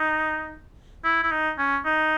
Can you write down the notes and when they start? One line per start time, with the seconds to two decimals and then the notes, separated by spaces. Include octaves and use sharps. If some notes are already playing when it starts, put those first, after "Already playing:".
Already playing: D#4
1.04 E4
1.23 E4
1.32 D#4
1.58 C#4
1.86 D#4